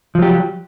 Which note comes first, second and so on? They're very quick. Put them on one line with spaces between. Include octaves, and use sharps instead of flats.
F3 F#3 G4